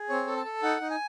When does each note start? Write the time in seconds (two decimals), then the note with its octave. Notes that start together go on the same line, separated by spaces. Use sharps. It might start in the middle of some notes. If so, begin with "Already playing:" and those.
Already playing: G#4
0.09 C4 C#5
0.27 A4
0.37 A5
0.45 A4
0.63 D#4 F#5
0.81 D#4
0.91 G#5